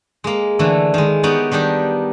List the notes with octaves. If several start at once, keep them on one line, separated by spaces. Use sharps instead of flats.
G#3 A#3
D3 E3 A3
D#3 G#3
B3 D#4 G4 C#5 D5
D#3 G3 D4 D#4 G4